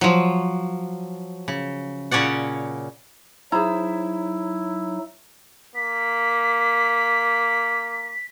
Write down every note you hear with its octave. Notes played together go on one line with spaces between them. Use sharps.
F3 F#3
C#3
A#2 C#3 C#4 C#5 D5 F#5
F#3 D#4 E4 G#4 C5 A#5
A#3 B6